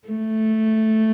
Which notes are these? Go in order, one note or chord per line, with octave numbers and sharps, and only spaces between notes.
A3